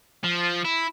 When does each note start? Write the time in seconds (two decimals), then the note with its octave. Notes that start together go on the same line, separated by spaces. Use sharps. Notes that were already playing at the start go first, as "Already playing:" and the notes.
0.24 F3
0.65 E4